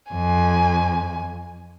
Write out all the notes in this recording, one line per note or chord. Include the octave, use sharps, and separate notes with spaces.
F2 G#5